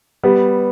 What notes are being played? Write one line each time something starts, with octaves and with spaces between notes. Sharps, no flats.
G3 B3